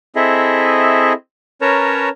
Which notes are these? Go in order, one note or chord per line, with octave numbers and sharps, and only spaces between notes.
C4 E4 G#4 A4 D#5 E5
C#4 A#4 B4 C#5 A5 A#5